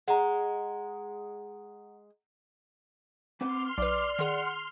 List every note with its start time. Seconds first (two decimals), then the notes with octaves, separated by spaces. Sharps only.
0.08 G#3 F#5 A#5
3.41 C4 B4 F#5 C6 D6 F6
3.78 B1 B4 D5 D6
4.19 D#3 G#4 F#5